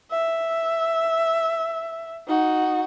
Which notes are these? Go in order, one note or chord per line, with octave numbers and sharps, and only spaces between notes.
E5
D#4 F#4